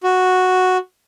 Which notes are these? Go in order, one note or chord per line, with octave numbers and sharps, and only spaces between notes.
F#4